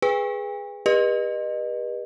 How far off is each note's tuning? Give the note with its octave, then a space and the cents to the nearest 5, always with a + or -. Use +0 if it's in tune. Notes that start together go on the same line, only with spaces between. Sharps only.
G#4 +0 B4 +0 G5 +45
G4 +35 B4 -35 D#5 -25